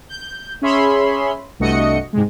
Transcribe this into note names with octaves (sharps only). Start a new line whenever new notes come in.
G6
C#4 G#4 C#5 E5 B5 C6
C2 G2 A3 F#4 D#5 C#7
G#2 C3 G#3